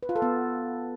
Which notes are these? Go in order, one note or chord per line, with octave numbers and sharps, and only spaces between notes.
B4
F4
A4
B3